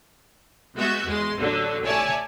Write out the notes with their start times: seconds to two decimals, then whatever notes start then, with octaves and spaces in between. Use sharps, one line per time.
0.77 G#3 B3 F#4 E5 G6
1.06 E2 G#3 C6
1.38 A1 D3 F#3
1.85 C#5 D5 E5 G#5 A5